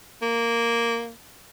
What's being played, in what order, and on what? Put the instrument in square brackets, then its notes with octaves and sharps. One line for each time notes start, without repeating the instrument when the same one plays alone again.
[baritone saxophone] A#3